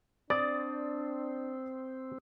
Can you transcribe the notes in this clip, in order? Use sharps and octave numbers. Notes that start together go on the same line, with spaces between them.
C4 D4 D5 D#6 A6